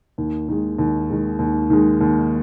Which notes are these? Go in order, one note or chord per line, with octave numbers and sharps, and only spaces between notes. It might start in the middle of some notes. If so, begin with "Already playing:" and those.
D#2
D#3 G#3
D#2
D#3 G#3
D#2
D#3 G#3
D#2